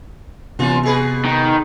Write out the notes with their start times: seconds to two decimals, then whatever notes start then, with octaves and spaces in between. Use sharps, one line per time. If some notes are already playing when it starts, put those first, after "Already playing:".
0.59 F#2 C3 E3 B3 F4
0.83 B2 G#4 B4
1.25 D#3